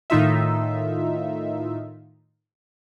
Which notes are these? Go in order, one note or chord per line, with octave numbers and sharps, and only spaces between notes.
A2 D#3 D#4 F4 E5